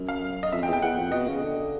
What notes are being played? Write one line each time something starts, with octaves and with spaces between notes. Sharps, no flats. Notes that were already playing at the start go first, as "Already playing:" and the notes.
Already playing: F#2
F5
D#5
F2 E5
G5
E2
G5
E2 F#5
F2
B2 D#5
C#3
D3